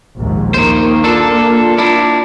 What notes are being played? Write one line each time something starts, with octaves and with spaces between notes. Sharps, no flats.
A#1 D#2 G#2
D#3 A#3 C5
D4 F4 A4
D4 E4